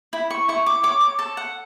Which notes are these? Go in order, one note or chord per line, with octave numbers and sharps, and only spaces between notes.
E4 B5
C#6
E4 C#6
D6
C#5 D6
D6
A4 A5
F#5